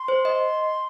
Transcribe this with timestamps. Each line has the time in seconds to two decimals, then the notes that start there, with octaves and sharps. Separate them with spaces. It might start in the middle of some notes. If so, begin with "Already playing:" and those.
Already playing: C6
0.08 C5
0.25 D#5